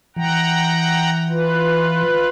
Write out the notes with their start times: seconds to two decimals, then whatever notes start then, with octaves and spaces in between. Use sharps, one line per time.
0.16 E3 F#5 G5 A#5
1.29 F4 B4